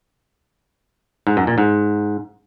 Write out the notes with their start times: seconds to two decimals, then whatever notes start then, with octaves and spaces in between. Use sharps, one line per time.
1.27 G#2
1.37 F#2
1.47 A#2
1.58 G#2